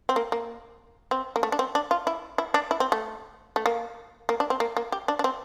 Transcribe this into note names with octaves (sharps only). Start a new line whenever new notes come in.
C4
A#3
A#3
C4
A#3
A3
D4
C4
D4
F4
E4
E4
D4
E4
C4
A3
A3
A#3
A#3
D4
C4
A#3
A#3
G4
D4
D4
C4